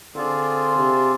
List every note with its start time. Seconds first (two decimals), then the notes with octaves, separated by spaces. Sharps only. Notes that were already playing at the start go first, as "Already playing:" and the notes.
0.15 D3 C4 F4 G#4 D5
0.76 C3